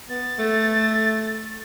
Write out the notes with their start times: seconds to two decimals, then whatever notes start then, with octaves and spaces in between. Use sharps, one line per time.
0.09 B3 A6
0.39 A3